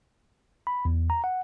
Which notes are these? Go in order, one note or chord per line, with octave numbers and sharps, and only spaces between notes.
B5
E2
A#5
F#5